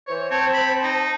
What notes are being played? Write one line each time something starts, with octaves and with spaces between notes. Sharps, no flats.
E3 C5 C#5
C4 C#5 A5
B5
D#4